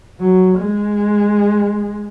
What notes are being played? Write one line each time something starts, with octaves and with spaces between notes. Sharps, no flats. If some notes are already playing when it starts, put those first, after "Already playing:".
F#3
G#3